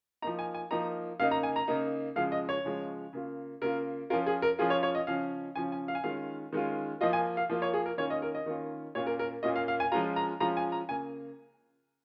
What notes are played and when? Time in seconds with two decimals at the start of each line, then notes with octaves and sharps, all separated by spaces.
0.22 F3 A#3 D#4 A#5
0.39 G#5
0.54 G#5
0.71 F3 A#3 D#4 A#5
1.20 C#3 A#3 D#4 F5
1.31 A#5
1.43 G#5
1.56 A#5
1.68 C#3 A#3 D#4
2.16 C#3 F3 G#3 F5
2.32 D#5
2.49 C#5
2.64 C#3 F3 G#3
3.13 C#3 A#3 F4
3.61 C#3 A#3 F4 A#4
4.10 F3 C#4 F4 A#4
4.26 G#4
4.42 A#4
4.59 F3 C#4 F4 G#4
4.70 C#5
4.83 C#5
4.95 D#5
5.07 C#3 F3 C#4 F5
5.55 C#3 F3 C#4 G#5
5.72 G#5
5.88 F5
5.95 G#5
6.04 D#3 G#3 C#4 F4 F5
6.53 D#3 G#3 C#4 F4
7.01 F3 A#3 F4 D#5
7.13 G#5
7.37 F5
7.50 F3 A#3 F4
7.62 C#5
7.73 G#4
7.86 A#4
7.98 D#3 A#3 C#4 F4 C#5
8.10 D#5
8.22 A#4
8.35 D#5
8.46 D#3 A#3 C#4 F4
8.95 A#2 A#3 C#4 F4 C#5
9.07 A#4
9.19 A#4
9.43 A#2 A#3 C#4 F4 D#5
9.56 F5
9.68 F5
9.80 G#5
9.92 F3 G#3 C#4 F4 A#5
10.16 A#5
10.40 F3 G#3 C#4 F4 A#5
10.57 G#5
10.72 A#5
10.89 C#3 A#3 G#5